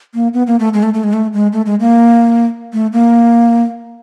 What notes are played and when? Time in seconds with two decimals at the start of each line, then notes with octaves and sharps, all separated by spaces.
0.14 A#3
0.34 B3
0.47 A#3
0.60 A3
0.74 G#3
0.83 A3
0.94 A3
1.04 G#3
1.13 A3
1.33 G#3
1.53 A3
1.66 G#3
1.80 A#3
2.73 A3
2.93 A#3